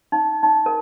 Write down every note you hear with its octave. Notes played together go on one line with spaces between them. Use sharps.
D#4
D#4
A#4